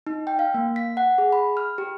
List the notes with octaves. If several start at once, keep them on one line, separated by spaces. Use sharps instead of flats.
D#4
G5
F5
A#3
B6
F#5
G#4
B5
F6
G4